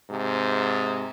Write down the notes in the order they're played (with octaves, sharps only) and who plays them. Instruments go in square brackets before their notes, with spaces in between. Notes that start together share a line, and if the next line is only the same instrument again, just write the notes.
[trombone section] G#2 C3